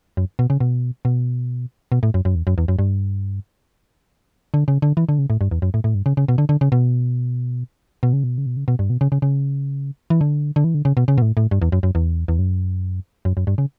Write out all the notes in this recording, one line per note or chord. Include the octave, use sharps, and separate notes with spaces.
F#2
B2
C#3
B2
B2
B2
A2
F#2
F#2
E2
F#2
E2
F#2
G2
D3
C#3
D3
E3
D3
C#3
A2
G2
E2
F#2
A2
A2
G2
C#3
C#3
B2
D3
D3
C#3
B2
B2
C#3
B2
C#3
B2
C#3
B2
G2
B2
C#3
C#3
C#3
E3
D3
D3
E3
D3
C#3
B2
C#3
B2
A2
A2
G2
E2
F#2
F#2
E2
E2
F#2
F#2
F#2
G2
C#3